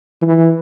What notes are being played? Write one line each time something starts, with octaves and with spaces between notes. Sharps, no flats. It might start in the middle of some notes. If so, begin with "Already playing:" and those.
E3